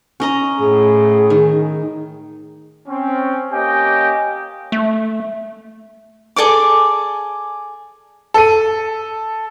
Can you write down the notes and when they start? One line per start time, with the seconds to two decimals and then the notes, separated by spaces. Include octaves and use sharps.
0.20 C#4 D#5 A#5
0.58 A2 G#4
1.30 D#3
2.88 C4 C#4
3.52 A#3 C#4 G4 D#5 G5 G#5
4.72 A3
6.36 G#4 A4 D5 D6
8.34 A4 D#7